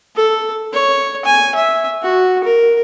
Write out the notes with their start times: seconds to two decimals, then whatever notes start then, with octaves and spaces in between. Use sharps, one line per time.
0.16 A4
0.73 C#5
1.25 G#5
1.55 E5
2.02 F#4
2.44 A#4